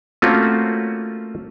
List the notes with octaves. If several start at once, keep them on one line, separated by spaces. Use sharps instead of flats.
A3 A#3 C4 C#4 F4 F#4